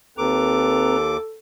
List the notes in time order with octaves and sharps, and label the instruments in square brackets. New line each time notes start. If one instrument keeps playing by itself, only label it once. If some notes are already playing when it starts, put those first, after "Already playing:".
[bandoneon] D#2 D6 [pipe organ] C4 B4 A#5 [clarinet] A4